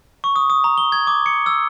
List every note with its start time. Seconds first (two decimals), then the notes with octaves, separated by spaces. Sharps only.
0.24 C#6
0.36 D#6
0.50 D#6
0.64 A#5
0.78 G7
0.92 G#6
1.07 D6
1.26 C#7
1.46 E6